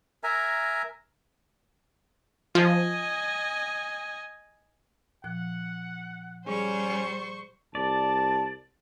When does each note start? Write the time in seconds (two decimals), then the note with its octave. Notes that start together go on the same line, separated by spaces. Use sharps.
0.24 A#4 E5 G#5 A#5
2.55 F3 D#5 G#5
5.24 A#2 F3 F#5 F#6
6.46 G3 C#4 G#4 C5 C#6
7.75 C2 D5 A5